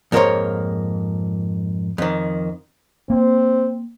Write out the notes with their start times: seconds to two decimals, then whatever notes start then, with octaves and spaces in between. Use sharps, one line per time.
0.12 F2 G#2 A#3 A#4 C5 C#5
1.98 F2 D#3
3.10 A#3 C4